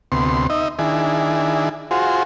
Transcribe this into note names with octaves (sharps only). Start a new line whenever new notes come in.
D2 C3 B3 C6
D#4 D#5 E5
D#3 D4 E4 G#4
F4 F#4 G#4 C5